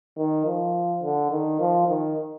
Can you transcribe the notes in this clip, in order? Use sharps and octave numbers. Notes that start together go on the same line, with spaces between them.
D#3
F3
D3
D#3
F3
D#3